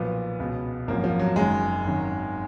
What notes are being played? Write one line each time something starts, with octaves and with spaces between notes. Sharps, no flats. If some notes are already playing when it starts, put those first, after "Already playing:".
Already playing: B1 A#2 F3 B3
C#2 B2
G#1 F#2 F3 A#3
F3
F#3
F#1 F#2 D#3 G#3
G#1 F#2 D#3